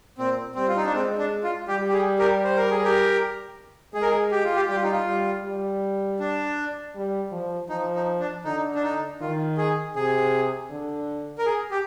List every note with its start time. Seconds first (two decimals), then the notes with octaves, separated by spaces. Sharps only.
0.18 A#2 C4
0.55 G3 C4
0.69 F4
0.77 D#4
0.85 D4
0.93 G#3 C4
1.18 D4
1.44 F4
1.68 G3 G4
1.89 G4
1.93 G#4
2.19 G4 A#4
2.44 C5
2.56 A#4
2.71 G#4
2.84 G4 A#4
3.94 G#3 G#4
4.02 A#4
4.10 G#4
4.31 G4
4.44 F4
4.56 G4
4.69 G3 G4
4.76 F4
4.84 D#4
4.91 F4
5.06 G3
5.44 G3
6.20 D4
6.95 G3
7.32 F3
7.69 F3 D#4
7.95 D#4
8.20 D4
8.44 D3 D#4
8.75 D4
8.83 D#4
9.21 D#3 F4
9.57 G#4
9.96 C3 G#4
10.70 D3
11.38 A#4
11.46 G#4
11.71 G4